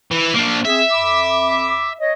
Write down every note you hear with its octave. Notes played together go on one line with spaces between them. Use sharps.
E3
A#3 D4
C4 G#4 E5
F2 B5 D6
C#5 D#5